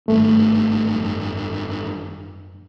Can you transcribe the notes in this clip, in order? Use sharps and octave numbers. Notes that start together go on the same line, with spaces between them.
G#1 G2 A3
F#2